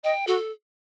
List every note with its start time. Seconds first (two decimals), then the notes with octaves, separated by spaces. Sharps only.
0.04 D#5 G5
0.27 F#4 A4